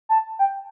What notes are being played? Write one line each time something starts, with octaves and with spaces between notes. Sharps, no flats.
A5
G5